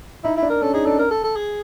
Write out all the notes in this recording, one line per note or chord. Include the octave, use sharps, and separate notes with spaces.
D#4 E4
E4
D4
A#4
C#4 A4
D#4 G#4
D4 A4
A#4
A4
A4
G#4